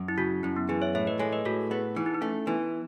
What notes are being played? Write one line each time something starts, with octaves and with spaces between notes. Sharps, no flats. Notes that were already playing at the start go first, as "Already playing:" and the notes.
Already playing: F#2
E4
C#3 F#4
F#2 E4
B3
E3 G#4
C#5 E5
A2 C#5 E5
B4 D#5
G#3 A4 C#5
B4 D#5
A2 F#4 A4
B3 G#4 B4
E3 D#4
E4
D#4
A3 C#4
E3 B3